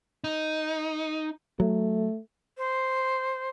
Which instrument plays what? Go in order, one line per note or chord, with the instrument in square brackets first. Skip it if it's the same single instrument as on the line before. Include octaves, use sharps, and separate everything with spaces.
[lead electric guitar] D#4
[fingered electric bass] F#3 [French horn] A3
[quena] C5